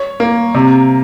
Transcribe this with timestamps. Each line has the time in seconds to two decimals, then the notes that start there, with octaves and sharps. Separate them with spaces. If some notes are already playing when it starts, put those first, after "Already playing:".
Already playing: C#5
0.20 A#3
0.55 C3